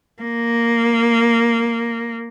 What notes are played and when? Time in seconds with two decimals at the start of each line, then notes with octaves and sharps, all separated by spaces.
0.22 A#3